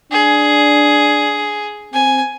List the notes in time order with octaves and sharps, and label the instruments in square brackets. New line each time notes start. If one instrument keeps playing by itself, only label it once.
[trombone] D4 [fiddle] G#4
[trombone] C4 [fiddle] G#5